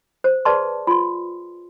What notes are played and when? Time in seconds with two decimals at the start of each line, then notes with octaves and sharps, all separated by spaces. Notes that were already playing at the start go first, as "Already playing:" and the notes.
0.24 C5
0.45 G#4 B4 D5 A5 C6
0.87 F4 C6